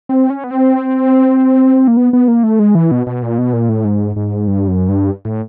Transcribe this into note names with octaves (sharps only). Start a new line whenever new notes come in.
C4
C#4
B3
C4
A#3
B3
B3
A#3
A3
G#3
E3
B2
B2
A#2
B2
A#2
A2
G#2
G#2
G2
F#2
G2
A2